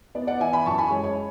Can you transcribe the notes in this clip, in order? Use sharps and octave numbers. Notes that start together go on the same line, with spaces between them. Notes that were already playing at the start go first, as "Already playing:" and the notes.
B3 D5
D5 F#5
E3 E5 G#5
G#5 B5
F#2 A5 C#6
G#5 B5
G#3 C#5
C#5